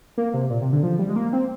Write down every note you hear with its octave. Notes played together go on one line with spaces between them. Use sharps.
A#3
C3
A#2
C3
D3
F3
G3
G#3
A#3
C4